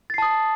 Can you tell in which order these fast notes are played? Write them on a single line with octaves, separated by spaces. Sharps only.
A6 C7 A5 D#6